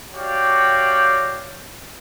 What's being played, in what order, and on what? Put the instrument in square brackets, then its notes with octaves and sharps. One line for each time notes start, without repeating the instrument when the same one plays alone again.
[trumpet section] F#4 G4 C#5 D5 F5 G5